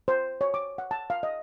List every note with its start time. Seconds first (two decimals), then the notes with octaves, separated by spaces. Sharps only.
0.08 C5
0.41 C#5
0.54 D6
0.78 F#5
0.91 A5
1.10 F5
1.23 D#5